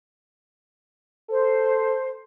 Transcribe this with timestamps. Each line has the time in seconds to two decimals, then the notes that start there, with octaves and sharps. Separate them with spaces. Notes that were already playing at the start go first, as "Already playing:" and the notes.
1.30 A4 C5